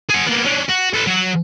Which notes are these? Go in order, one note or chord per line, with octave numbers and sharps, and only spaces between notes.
G#4 F#5
A#3 B3
C#4 D4
F#4
A4 B4
F#3 F#4